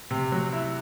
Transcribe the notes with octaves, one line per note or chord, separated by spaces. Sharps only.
C3
F#3
E4